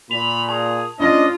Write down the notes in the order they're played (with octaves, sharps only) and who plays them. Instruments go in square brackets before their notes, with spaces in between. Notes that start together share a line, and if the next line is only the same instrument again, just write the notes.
[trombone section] A#2 [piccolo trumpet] B5 [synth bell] F7
[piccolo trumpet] G#4 [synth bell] A5
[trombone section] A2 C#4 D4 [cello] F4 [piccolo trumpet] D#5